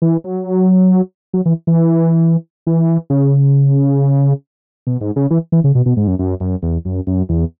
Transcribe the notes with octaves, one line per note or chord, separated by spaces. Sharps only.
E3
F#3
F#3
E3
E3
E3
C#3
B2
G#2
C#3
E3
E3
C#3
B2
B2
G#2
F#2
F#2
F#2
E2
F#2
F#2
E2